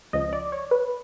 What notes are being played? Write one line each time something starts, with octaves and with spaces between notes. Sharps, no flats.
C#2 C#3 F3 D#5
D5
C#5
B4